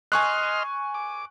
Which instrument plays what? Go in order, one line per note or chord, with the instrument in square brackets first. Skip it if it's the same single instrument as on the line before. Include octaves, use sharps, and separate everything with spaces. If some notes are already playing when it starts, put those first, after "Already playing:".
[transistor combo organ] D#5 C6 F6 [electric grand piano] G#5 C#6 F#6
[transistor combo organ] D6